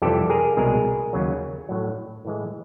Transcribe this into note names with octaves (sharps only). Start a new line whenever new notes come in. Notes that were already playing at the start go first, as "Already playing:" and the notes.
F2 C3 E3 G3 G4 A4
G#4 A#4
C2 B2 G#3 G#4 A#4
D#2 C#3 F#3
A2 F#3
A2 E3 G#3